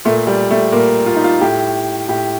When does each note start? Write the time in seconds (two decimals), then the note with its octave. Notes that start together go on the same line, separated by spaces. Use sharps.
0.05 A#2 A3
0.27 G3
0.51 A3
0.72 A#2 A#3
1.06 F4
1.16 D#4
1.24 F4
1.41 A2 G4
2.09 A2 G4